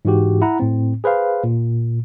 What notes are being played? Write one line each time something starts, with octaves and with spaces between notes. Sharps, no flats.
G#2 E3 G#3 F#4 G4
E4 F#5 A#5
A2 C4
G#4 B4 C5 F5
A#2